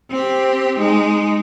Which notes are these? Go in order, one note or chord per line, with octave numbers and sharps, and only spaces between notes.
C4 G4
G#3 D#4